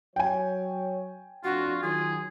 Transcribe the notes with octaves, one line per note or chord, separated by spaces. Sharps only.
F#3 C#5 G5 G#5
F2 A2 D4 F4 F#4
D#3 F#3 F4 G#4